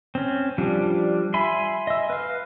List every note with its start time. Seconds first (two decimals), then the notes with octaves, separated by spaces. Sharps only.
0.15 C4 C#4
0.58 F3 G3 D4
1.34 E5 G#5 B5 C6
1.87 D#5 E5
2.10 B4 F5